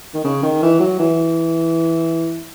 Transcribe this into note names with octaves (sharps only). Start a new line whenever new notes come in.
D#3
C#3
D#3
E3
F#3
E3